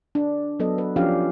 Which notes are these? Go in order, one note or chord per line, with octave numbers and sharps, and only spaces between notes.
D4
F#3 B3 A4 D#5
B4
F3 C#4 D4 G4 F5